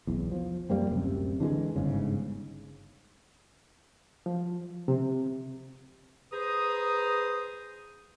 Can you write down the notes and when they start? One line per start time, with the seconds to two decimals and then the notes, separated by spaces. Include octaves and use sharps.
0.07 B1 E2
0.32 F3
0.70 F#2 G3 A#3 C4
0.91 D1 F#2 C3
1.40 D3 E3 G3 G#3
1.76 G1 G#2 C#3
4.26 F3
4.88 C3
6.32 G#4 B4 C5 A#5 D#6